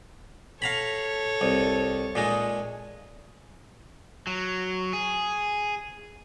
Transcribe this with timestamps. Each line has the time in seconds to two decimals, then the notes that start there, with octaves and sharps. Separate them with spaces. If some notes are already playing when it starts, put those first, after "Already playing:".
0.62 A4 C#5 F5 A#5 B5
1.41 C2
2.15 A#2 G#3 D#4
4.27 F#3
4.93 G#4